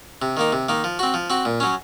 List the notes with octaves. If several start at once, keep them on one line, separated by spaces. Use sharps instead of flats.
C3
D#3 A#3 D#4
C3
D#3 A#3 D#4
F3
C4 F#4
F3
C4 F#4
A#2
F#3 C#4